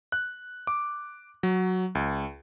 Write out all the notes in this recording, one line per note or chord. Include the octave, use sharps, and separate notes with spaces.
F#6
D6
F#3
C#2